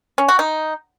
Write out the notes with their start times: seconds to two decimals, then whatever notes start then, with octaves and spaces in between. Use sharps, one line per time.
0.18 C#4
0.28 F#4
0.39 D#4